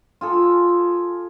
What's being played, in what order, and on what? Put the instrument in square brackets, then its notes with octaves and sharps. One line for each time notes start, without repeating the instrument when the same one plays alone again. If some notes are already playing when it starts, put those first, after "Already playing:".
[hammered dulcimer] F4 G#4 A4